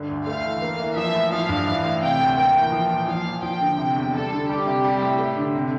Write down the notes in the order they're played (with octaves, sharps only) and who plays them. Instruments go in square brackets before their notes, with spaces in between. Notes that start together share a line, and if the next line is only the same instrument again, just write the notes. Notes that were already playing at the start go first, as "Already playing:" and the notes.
Already playing: [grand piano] G2 D3
D2
[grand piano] A3 [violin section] F5
[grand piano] E3
A#3
E3
[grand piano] F3 [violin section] E5
[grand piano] A2
[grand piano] F3 [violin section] F5
[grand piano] G2
E3
A2
[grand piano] C3 [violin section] G5
[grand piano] D2
[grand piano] A#3 [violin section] G5
[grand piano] E3
F3
A#2
[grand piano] F3 [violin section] F5
[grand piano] A#2
[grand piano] F3 [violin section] G5
[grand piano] D3
C3
E2
[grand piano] G3 [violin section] A4
[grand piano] D3
[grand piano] G3 [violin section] G4
[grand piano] C3
G3
A2
A3
D3
C3